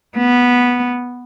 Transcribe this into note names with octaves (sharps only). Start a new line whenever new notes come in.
B3